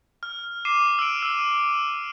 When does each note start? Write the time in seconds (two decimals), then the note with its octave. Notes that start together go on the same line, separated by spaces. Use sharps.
0.23 F6
0.65 D6 C7 D#7 E7
0.99 E6 D7
1.22 E6 D#7